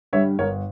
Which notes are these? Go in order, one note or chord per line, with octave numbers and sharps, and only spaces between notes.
G2 D3 G3 C#5 E5
G1 A#4 C#5